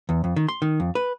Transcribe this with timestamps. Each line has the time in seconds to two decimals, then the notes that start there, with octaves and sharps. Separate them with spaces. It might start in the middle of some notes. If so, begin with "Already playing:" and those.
0.09 E2
0.24 F2
0.36 D#3
0.49 C6
0.62 D#3
0.80 F2
0.95 B4